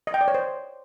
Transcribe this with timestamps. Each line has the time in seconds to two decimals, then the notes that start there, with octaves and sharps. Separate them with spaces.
0.07 D#5
0.14 G5
0.21 D5
0.28 C#5
0.35 C5